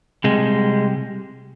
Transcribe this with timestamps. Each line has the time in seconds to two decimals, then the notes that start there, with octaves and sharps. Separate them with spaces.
0.24 C3 G3 G#3